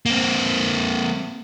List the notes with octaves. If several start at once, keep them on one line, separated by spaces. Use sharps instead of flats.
A#3 C4